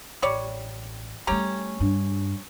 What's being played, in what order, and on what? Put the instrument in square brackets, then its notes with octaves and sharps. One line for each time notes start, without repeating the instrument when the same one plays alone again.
[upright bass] A1 [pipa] G3 C#5 D5
[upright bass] G3 A3 [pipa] C#4 G4 A#5
[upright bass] G2 D4